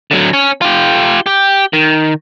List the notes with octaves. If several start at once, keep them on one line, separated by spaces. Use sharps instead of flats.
D3 F#3
C#4
F4 G4
G4
D#3